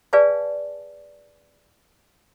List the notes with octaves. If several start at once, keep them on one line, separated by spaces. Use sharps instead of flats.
G#4 B4 D5 F5 G#5 A5